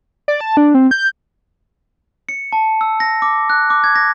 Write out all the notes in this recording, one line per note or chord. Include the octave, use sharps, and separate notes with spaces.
D5
A5
D4
C4
G6
C#7
A5
E6
A#6
D6
F#6
D6
G#6
A#6